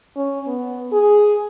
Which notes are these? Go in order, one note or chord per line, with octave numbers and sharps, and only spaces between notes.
C#4
B3
G#4